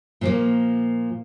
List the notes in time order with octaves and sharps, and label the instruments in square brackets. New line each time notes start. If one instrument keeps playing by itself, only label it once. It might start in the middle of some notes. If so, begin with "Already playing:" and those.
[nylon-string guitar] A#2 F3 A#3